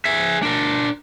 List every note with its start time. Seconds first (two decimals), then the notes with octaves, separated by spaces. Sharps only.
0.05 G#4 E5
0.43 D4 A#4